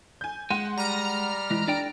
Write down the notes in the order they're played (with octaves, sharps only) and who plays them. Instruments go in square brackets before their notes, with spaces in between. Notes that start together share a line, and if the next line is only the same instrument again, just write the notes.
[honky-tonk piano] G#5 G6
[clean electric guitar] G#3 [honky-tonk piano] F#5 C6
[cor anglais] G3 [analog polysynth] A#5 F6
[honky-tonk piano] E3 [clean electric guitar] G#3
[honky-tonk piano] D4 [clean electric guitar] A4 D5 G5